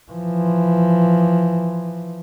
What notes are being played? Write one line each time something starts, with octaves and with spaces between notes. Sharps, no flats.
E3 F3